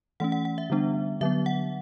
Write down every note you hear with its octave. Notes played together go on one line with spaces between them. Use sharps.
E3 A3 C#4 F#5
F#5
F#5
E5
D3 G3 B3 D4
D3 F#3 B3 E5
F#5